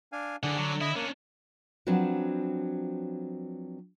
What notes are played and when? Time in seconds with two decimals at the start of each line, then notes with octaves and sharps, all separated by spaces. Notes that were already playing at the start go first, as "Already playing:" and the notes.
0.12 D4 F5 G#5
0.43 D3 D4 G#4 F#5
0.58 F#3
0.81 E4 D#5 E5 D#6
0.96 A#3 C#4 D4
1.87 F3 F#3 C4 D4 B4